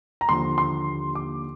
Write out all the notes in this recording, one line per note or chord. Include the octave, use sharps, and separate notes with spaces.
A#5
D#2 D3 F3 C6
C6
D6